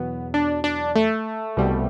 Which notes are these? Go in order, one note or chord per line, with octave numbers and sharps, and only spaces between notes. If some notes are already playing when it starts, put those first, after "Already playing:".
Already playing: E2 B2 F#3 B3
D4
D4
A3
C2 B2 G3